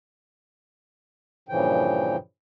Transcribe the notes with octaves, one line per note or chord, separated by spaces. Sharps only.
G2 A#2 C#3 E3 F3 G5